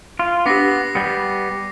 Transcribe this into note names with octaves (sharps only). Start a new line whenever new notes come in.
F4
B3 D4 G4 D6 A#6 C7
G3 B3